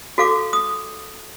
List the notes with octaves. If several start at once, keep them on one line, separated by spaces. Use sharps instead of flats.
F#4 A4 F5 D6
D#6